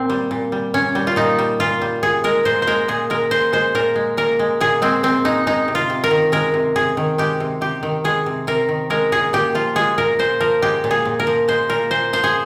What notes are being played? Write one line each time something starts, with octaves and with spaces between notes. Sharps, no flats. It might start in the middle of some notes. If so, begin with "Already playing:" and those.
Already playing: A#2 C4
G3
A#2
G3
A#2 C#4
G3
F4
A#2 D#4
G3
A#2 F4
G3
A#2 G#4
G#3 A#4
A#2 C5
C5
G#3 A#4
A#2 G#4
G#3 A#4
A#2 C5
G#3 C5
A#2 A#4
G#3
A#2 A#4
G#3
A#2 G#4
G#3 C4
A#2 C4
G#3 D#4
G#3 D#4
C3
F4
C3
A#4
D#3
G#3 A#4
C3
C3 G#4
D#3
G#3 G4
C3
C3 G4
D#3
G#3 G#4
C3
C3 A#4
D#3
G#3 A#4
A#2 G#4
A#2 G4
F3 F4
G#3 G#4
A#2 A#4
A#2 C5
F3 A#4
G#3 G4
A#2
G#4
A#2
A#4
F3
G#3 C5
A#2 A#4
A#2 C5
F3 C5
G#4